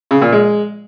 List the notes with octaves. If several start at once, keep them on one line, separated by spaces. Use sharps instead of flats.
C#3
A#2
G#3